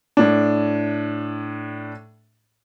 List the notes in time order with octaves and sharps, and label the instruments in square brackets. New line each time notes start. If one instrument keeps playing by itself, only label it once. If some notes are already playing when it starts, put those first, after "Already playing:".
[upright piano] A2 D4